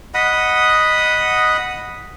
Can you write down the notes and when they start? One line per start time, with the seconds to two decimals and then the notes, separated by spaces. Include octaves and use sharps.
0.14 D#5 F#5 B5 D#6